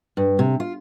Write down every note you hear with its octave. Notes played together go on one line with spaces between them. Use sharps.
G2
C3
F4